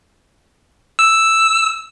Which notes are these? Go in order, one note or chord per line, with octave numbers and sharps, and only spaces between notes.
E6